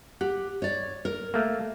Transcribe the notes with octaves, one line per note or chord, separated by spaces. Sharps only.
G4 F#5
C#5 D5
A#4
A3 A#3